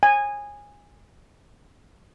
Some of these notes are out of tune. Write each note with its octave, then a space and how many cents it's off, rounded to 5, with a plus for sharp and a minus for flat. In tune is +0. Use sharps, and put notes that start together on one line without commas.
G#5 -15